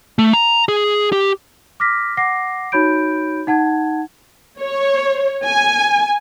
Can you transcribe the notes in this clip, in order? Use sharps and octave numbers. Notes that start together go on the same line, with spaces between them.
A3
A#5
G#4
G4
D6 F6 A#6 B6
F#5 D6 A#6 C7
D#4 F#4 C#5 B5 G6 D7
D#4 F#5 A5 G#6
C#5
G#5